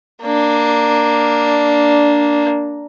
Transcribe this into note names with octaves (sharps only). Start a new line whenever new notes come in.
A#3 D4